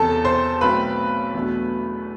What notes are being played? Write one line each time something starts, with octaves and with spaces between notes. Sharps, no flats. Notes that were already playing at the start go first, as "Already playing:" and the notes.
Already playing: E1 E2 C3 A4 A5
C5 C6
B1 B2 A3 C4 B4 B5
E2 B2 F#3 A3 D4